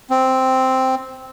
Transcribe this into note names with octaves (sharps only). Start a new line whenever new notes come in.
C4